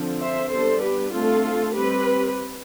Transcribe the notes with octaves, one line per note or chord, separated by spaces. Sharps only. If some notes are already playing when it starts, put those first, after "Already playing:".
Already playing: D3 F3 C4
C5 E5
G3 B3 D4 A4 C5
G4 B4
D3 A3 C4 F4 A4
G3 C4 G4 B4